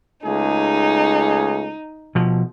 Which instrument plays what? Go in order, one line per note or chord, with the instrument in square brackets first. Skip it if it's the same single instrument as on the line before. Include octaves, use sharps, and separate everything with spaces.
[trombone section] C#2 A3 G#4 [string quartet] D#4
[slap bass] B2 F3